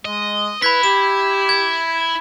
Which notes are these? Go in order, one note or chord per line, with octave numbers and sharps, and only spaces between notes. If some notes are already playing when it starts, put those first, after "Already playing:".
G#3 D#5
E4 B4 B5 G#6 B6
G4 E7
G#6